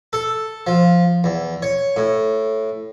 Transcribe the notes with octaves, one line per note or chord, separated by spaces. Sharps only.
A4
F3
E2
C#5
A2